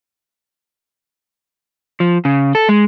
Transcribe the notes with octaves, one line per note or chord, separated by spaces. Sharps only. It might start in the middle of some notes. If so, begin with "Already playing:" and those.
F3
C#3
A4
G#3